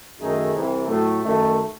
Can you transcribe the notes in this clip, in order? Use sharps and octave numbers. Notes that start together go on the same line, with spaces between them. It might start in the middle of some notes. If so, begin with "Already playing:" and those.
F#2 D#3 A3 D#4 G#4
C2 C3 E3
A2 F#3 A3
F#2 D#3 A3